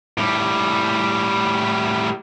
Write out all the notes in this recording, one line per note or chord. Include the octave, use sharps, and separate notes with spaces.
A2 G3